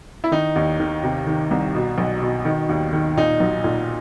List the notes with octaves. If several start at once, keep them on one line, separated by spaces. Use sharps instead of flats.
E4
D#3 D#4
D#2
D#3
C3
D#3
C2
B2
B1
B2
D#3
D#2
D#3
A#2 D#4
B1
A#2